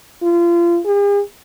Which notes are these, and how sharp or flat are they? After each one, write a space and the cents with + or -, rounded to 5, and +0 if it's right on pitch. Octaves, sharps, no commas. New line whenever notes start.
F4 -30
G#4 -45